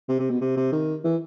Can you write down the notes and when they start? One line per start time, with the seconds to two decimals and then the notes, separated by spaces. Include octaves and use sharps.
0.09 C3
0.20 C3
0.30 B2
0.41 C3
0.57 C3
0.72 D#3
1.04 E3